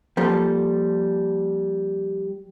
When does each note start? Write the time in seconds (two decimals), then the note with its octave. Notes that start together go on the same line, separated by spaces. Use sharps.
0.17 F3 G3 A#3 A4